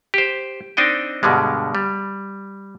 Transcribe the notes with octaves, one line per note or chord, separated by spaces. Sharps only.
G4 C5
C4 D4 D#4 D#5 G5
G2 B2 D3 G3 G#3
G3